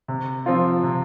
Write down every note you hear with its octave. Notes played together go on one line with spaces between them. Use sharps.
C3
F3 C4 F4
C3